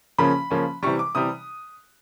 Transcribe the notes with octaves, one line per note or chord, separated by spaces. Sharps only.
C#3 F3 A#3 C#4 B5
C#3 F3 A#3 C#4
C3 E3 G3 C#6
D6
C3 E3 G3 D#6